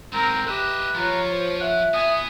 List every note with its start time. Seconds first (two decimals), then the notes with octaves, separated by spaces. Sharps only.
0.12 G#2 F#3 C4 A#4 A#5
0.47 G4 B4 D#5 E5
0.95 F3 F4 C#5 A#5
1.32 C5
1.60 E5 F#5
1.94 B3 G#5 D#6